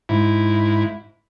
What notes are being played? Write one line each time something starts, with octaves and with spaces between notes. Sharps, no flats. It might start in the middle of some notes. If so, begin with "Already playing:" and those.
G#2 E4